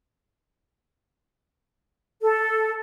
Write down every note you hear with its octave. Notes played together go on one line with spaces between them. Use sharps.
A4